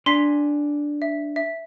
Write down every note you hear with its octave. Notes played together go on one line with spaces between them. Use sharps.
D4 G#5 A#5 C6 B6 C7
E5
E5